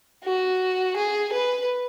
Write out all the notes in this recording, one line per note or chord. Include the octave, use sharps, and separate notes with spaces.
F#4
G#4
B4